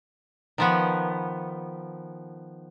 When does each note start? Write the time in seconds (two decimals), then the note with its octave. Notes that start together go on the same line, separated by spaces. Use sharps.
0.58 D#3 F3 B3